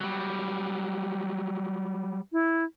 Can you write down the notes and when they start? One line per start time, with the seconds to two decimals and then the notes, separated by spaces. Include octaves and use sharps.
0.01 F#3 G3
2.32 E4